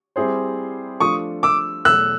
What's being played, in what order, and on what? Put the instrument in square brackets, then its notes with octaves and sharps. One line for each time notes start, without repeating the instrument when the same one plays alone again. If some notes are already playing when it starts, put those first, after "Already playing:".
[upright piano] G3 C4 E4 G#4 C5
[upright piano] F3 A3 D4 F4 [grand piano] C#6 D#6
[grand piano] D6 E6
[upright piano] E2 B2 F#3 A3 [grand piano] E6 F#6